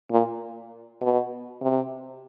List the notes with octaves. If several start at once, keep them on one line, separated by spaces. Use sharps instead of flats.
A#2
B2
C3